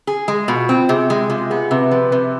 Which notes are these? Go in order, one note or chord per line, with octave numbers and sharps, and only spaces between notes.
G#4
G#3
B2 F4
C4
C3 G#4
G#3 G#4
C3 F4
B3 G#4
C3 B4
F3 B4
C3 B4